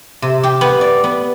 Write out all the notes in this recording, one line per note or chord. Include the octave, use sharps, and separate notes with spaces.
C3
G4
B3
D5
B3